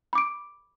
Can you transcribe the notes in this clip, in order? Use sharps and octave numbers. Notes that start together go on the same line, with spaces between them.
B5 D6 D7